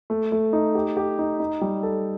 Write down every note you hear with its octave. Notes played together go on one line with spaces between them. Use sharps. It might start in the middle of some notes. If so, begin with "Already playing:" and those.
A3
A3
D#4
G4
G4
D#4
D#4
G3
A4